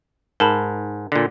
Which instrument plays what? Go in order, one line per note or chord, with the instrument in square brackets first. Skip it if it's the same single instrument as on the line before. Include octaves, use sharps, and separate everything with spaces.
[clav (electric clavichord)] G#2 [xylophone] A#4 A5 B5
[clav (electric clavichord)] A#2 D3